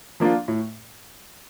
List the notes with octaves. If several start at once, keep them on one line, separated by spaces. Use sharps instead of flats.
F3 A#3 D4 F4
A2